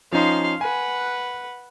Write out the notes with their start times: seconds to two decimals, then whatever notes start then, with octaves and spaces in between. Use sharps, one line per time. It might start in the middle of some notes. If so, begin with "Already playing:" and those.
0.12 F3 C#4 D#4 F5 C6
0.61 B4 F#5 G#5